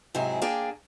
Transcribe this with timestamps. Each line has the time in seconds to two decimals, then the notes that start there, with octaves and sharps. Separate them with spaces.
0.15 G#2 C3 F#3 E4 G#4
0.42 A#3 D4 G#4 G5